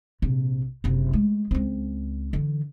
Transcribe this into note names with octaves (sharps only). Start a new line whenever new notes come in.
A#1 C3
F#1 C3
G#3 A3
C#2 C4
D3 E3